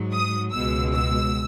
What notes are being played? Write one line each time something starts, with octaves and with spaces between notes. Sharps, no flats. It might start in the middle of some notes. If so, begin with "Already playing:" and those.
Already playing: G#2 F#3
D#6
C#2 B2 G#3 E6
E6